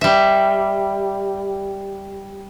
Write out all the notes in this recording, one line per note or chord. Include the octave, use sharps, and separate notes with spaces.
G3 E5